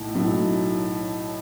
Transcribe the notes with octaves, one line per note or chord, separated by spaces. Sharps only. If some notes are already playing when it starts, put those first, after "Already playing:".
Already playing: B1 A2
B1 A2 F#3